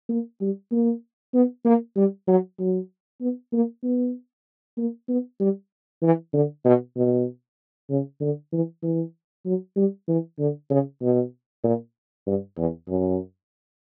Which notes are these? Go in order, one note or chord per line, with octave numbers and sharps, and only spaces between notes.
A#3
G3
A#3
B3
A#3
G3
F#3
F#3
B3
A#3
B3
A#3
B3
G3
E3
D3
B2
B2
C#3
D3
E3
E3
F#3
G3
E3
D3
C#3
B2
A#2
G2
E2
F#2